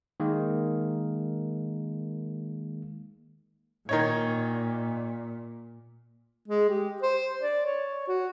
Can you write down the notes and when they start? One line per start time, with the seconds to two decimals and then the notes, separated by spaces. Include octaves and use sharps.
0.20 D#3 G#3 A#3
3.89 A#2 D#3 D#4 C#5
6.48 G#3
6.69 G4
7.02 C5
7.42 D5
7.66 C#5
8.08 F#4